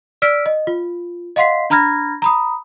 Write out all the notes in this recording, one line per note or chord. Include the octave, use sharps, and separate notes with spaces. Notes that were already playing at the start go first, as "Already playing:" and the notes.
D5 E6 F6 B6 D7
D#5
F4
D#5 F5 F#5 C6 B6 C7
D4 A#5 B5 F6 G#6 A#6
A#5 B5 D#6